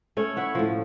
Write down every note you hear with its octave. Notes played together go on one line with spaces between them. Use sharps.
A3 C#4 C#5
E4 C#5 E5 F#5
A2 F3